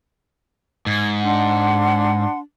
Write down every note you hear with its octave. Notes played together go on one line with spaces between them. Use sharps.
G#2 G#6
D4 F#5 C6